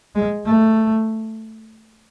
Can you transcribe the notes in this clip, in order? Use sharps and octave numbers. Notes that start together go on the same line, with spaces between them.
G#3
A3